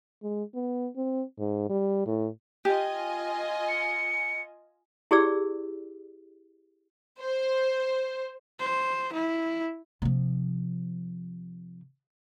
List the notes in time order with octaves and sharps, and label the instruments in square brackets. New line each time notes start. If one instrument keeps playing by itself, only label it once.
[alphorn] G#3
B3
C4
G#2
G3
A2
[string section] F4 D#5 G#5 [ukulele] G4
[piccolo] C#7
[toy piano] E4 G4 G#4 D5 E6
[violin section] C5
[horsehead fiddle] C5
E4
[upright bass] C3 F3